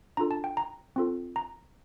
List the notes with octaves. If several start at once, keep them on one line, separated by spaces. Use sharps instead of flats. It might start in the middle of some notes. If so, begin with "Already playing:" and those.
D4 F4 A4 A#5
A5
G5
A#5
C4 F4 A4
A#5